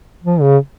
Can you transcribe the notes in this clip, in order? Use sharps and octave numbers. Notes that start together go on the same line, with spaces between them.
F3
C#3